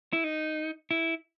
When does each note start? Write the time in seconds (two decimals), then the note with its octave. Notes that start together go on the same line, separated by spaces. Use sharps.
0.13 E4
0.24 D#4
0.91 E4